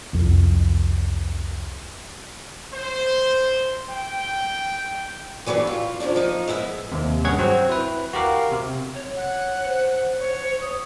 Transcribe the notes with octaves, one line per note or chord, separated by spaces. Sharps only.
C2 F2
C5
G5
E3 F#3 G3 C#4 D4
F4
C3 F3 C#4 D4
F3 D#4
G#3 B3 E4 E5
D#2 C3
G2 C#4 G#4 C#5 F#5 G#6
F#3 C4 F#4 C5
E4 B4
F#4 G4 A#4 F5
C3
C#5
F#5
C5
C#5
D#6